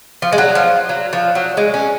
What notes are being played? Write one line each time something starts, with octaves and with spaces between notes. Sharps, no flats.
F3
G#3
F#3
F3
F#3
F3
F#3
G#3
C#4